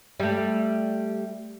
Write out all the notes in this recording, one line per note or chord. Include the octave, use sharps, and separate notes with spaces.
G3 A3